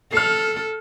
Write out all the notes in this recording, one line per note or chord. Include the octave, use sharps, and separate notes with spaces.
A4 F6 C7